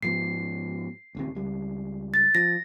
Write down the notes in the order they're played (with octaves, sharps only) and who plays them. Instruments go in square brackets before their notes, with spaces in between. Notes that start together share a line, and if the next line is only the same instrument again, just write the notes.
[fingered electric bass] G#2 F3 B3 [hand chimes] C7
[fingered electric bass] A1 D2 C3
C#2 G3
[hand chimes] A6
[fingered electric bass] F3 [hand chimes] A#6